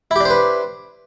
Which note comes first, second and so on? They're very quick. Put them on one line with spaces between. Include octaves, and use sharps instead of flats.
E4 G4 D4 C5 B4